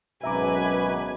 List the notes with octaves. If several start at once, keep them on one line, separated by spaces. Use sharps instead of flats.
G#1 F#2 B2 B4 E5 G#5 A#5 D6